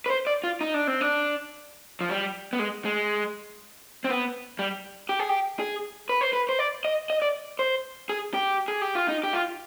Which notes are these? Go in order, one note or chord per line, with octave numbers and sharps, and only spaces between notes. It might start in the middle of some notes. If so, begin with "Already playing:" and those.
B4
C5
D5
F4
D#4
D4
C4
D4
F3
G3
B3
G#3
G#3
C4
B3
G3
G4
G#4
G4
G#4
B4
C5
B4
C5
D5
D#5
D#5
D5
C5
G#4
G4
G#4
G4
F4
D#4
G4
F4